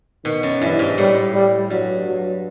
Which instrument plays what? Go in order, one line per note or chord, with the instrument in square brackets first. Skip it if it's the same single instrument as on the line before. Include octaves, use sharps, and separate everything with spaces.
[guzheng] B2 [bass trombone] D#3
[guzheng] F#2
[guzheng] G2 [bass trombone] E3
[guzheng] G#2
[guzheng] A2 [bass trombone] G3
[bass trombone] G3
[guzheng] G2 [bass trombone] F#3
[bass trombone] F#3